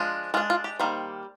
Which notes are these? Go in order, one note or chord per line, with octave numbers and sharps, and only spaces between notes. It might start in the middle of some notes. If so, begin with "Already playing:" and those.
Already playing: F3 G#3 D4
G#3 D4 F4
F4
G4
D#3 G3 A#3 C5